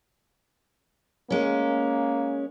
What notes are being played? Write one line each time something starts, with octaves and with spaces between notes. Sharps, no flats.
G#3 A#3 C#4